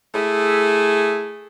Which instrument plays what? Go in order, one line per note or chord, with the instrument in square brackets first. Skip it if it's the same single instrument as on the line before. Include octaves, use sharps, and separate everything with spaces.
[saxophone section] A3 E4 G#4